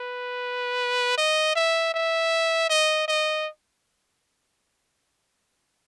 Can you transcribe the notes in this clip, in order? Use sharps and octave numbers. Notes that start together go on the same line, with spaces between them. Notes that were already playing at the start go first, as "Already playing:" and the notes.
Already playing: B4
D#5
E5
E5
D#5
D#5